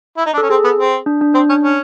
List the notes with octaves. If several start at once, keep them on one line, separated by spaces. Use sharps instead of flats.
E4
D#4
D4
C#4 A4
C4 G#4
B3
C4
D4
D4
C4 D4
C#4
C#4